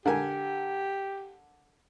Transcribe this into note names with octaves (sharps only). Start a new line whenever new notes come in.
D3 G4 A#4 G#5